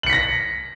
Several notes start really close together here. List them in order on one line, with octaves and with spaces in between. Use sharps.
F#7 C#7 B6 A#6